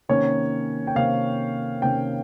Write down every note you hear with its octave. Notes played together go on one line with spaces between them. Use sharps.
C3 D#3 A#3 C#4 C#5
G5
C3 D#3 A#3 C#4 F5
C3 D#3 A#3 C#4 G5